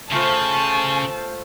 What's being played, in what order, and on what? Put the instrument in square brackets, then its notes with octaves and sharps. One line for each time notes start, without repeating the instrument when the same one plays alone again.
[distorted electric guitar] C#3 [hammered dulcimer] A3 F4 C5 [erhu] A5 [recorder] C#6